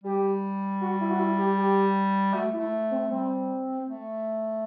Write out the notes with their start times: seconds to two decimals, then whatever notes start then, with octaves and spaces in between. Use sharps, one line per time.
0.04 G3 G4
0.81 F#4
1.01 E4
1.10 F#4
1.20 E4
1.38 G4
1.58 G4
2.34 A3 F#4
2.53 E4
2.58 A3
2.91 C4
3.10 G3 C4
3.87 A3